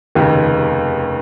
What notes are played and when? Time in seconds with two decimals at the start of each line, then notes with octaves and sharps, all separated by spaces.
0.15 F1 D#2 C#3 G4